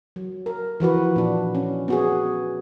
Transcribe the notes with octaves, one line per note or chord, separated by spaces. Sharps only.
F#3
A#4
E3 F3 F#4 B4
A#2 D4
C#4
B3 F#4 G#4